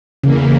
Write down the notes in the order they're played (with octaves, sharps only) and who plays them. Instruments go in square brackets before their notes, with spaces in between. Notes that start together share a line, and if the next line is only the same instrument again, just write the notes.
[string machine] E2 E3 A#3 [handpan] C#3